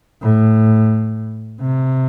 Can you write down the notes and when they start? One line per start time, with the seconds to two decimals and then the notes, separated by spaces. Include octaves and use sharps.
0.22 A2
1.61 C3